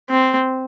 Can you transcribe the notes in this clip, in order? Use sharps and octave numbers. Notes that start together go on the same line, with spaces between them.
C4